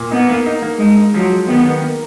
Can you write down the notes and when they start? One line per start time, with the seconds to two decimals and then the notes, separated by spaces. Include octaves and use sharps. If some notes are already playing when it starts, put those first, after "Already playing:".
Already playing: A#2
0.11 B3 D#4
0.29 A#3
0.46 D#4
0.62 A#3
0.79 G#3 D#4
0.96 D#4
1.13 F3 F#3
1.30 G#3
1.48 D#3 B3
1.65 D#3
1.82 A#3